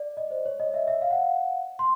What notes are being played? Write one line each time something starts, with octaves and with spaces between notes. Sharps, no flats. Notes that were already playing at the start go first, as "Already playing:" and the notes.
Already playing: D5
D#5
C5
C#5
D#5
E5
E5
F5
F#5
C6